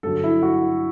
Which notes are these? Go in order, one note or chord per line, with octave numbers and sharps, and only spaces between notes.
G2 D3 F#3 A4
E4
F#4